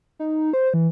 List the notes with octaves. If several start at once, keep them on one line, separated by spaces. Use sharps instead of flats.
D#4
C5
E3